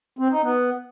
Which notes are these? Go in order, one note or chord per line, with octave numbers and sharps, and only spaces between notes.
C4
D#4
B3